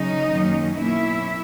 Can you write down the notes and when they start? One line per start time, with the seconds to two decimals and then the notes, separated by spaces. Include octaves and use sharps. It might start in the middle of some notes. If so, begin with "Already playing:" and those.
Already playing: C#3 F#3 C#4 D#4 D#5
0.32 F#2 D#3 F#3 A#3 C#4
0.76 B2 A#3 C#4 E4 E5